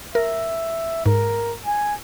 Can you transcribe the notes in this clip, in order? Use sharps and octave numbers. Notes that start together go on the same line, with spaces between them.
A#4 E5
G#2 A#4
G#5